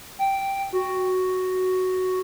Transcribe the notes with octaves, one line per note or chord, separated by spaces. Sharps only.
G5
F#4